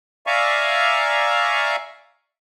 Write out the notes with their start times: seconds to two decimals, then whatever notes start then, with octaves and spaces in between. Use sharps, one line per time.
0.27 D5 E5 F5 G#5 A#5 C#6